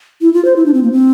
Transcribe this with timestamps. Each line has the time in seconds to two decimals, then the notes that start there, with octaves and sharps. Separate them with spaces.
0.21 E4
0.34 F4
0.45 C5
0.56 E4
0.66 D4
0.74 C4
0.83 A#3
0.92 C4